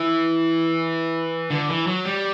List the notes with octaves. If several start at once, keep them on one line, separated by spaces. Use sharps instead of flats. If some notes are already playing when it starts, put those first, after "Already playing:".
Already playing: E3
D3
E3
F#3
G3